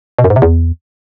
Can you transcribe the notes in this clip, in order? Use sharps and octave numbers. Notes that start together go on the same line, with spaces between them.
B2
F#2
G#2
C3
E2